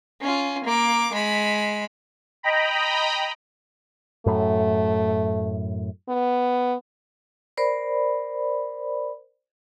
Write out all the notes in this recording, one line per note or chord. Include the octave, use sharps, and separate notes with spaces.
C#4 F4
A#3 D6
G#3 B5
D#5 G5 A#5 B5
F#2 A2 A3
B3
A#4 C5 D5 B5